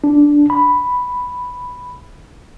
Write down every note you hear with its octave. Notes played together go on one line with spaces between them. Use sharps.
D4
B5